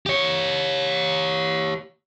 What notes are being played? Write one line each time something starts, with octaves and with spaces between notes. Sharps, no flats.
G4 C#5